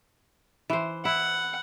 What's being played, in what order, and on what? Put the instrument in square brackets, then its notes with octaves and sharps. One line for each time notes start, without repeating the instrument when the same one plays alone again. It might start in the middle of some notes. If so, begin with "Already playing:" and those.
[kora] E3 C5
[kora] E4 [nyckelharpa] F#5